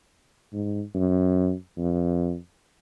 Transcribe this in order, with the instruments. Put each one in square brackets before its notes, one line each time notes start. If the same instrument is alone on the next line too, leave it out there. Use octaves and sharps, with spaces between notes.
[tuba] G#2
F#2
F2